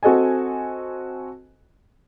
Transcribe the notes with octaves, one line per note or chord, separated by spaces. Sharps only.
C4 F#4 A4 D#5 G#5